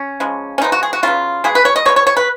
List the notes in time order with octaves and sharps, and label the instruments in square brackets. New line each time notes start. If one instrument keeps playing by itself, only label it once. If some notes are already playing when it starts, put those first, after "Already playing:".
Already playing: [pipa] C#4
C#3 F3 G#3
C#4
F3 G#3 B3 D#4
F#4
G#4
F#4
C#3 F#3 B3 F4
B2 G#3 B3 G#4
B4
C#5
D#5
B2 G#3 B3 C#5
C#5
C#5
B4